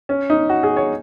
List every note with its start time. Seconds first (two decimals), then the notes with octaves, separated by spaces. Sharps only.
0.09 C#4
0.30 D#4
0.49 F#4
0.63 G#4
0.77 C#5